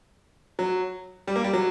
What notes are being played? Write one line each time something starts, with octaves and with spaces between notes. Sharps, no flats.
F#3
G3
A#3
G3
F#3